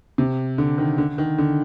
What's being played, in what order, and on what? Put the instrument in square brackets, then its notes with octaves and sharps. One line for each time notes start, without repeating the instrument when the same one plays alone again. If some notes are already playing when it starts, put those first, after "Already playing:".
[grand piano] C3
D3
D#3
D3
D#3
D3